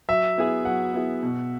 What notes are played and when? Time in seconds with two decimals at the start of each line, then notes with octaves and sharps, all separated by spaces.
0.09 F#3 E5
0.38 B3 E4 G#4
0.65 F#3 F#5
0.94 B3 E4 G#4
1.23 B2